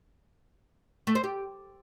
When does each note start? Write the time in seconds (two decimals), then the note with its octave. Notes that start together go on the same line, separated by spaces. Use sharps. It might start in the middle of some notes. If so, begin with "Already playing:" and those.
1.07 A3
1.15 C5
1.24 G4